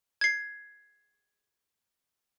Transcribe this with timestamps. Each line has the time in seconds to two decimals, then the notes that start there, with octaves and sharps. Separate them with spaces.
0.21 G#6 C7